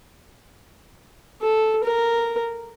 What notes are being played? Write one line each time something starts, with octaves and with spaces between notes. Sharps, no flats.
A4
A#4